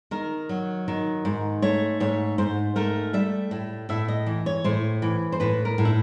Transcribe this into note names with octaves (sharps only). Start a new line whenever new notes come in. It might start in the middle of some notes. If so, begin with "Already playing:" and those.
D#3 A#4
F#3
D#3
G#2
A3 C#5
G#2 C#5
G#2 C5
A3 A#4
G3 E5
A2
A2 E5
D#5
E3
C#5
A2 C5
E3
C5
A2 B4
A#4
A2
E4